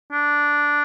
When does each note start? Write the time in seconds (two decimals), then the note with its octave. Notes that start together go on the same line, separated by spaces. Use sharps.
0.12 D4